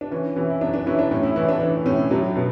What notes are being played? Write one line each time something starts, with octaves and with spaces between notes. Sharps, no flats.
D4
E3 C#4
E3 C#4 E4
E4
F#2 D4
D4
E3 C#4 E4
D4
A2 C#4
C#4 E4
E3 C#4 E4
D4
E3 D4
A2 C#4
F#3 D4
B2